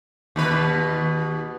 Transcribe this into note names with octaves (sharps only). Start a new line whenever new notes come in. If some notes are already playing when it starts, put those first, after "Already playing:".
D#2 B2 B4